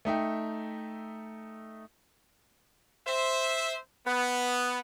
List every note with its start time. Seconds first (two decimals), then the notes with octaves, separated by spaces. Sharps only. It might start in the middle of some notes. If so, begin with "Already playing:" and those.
0.05 A3 D#4 E5 G5
3.07 C5 E5
4.06 B3